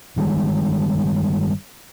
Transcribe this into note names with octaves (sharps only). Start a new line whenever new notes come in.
G1 D#3 G3 G#3